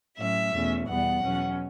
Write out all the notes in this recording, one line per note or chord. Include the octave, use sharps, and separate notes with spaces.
A2 F#3 C#4 E5
E2 B2 A3 C#4
E2 B2 G3 B3 F#5
E2 B2 F#3 C#4